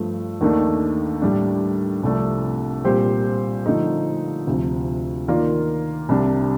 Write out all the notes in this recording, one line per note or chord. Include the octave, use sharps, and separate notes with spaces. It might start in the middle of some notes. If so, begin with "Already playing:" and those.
Already playing: G2 F3 A3
D#2 D#3 A3 D4
A2 G3 D4
C2 C3 F3 A3 D4
A#2 G3 C4 G4 C5
D3 F3 A3 D#4
D2 C3 F3
D#3 A#3 F4 A#4 D5
C2 C3 G3 D4